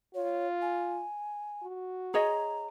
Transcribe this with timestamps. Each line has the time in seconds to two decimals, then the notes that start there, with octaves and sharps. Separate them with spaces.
0.15 F4 C#5
0.62 G#5
1.62 F#4
2.14 G#4 C#5 D#5 A#5